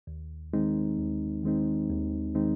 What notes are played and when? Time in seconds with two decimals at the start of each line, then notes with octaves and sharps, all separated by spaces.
0.07 D#2
0.53 D#3 G#3 C4 D#4
0.98 D#2
1.43 D#3 G#3 C4 D#4
1.89 D#2
2.35 D#3 G#3 C4 D#4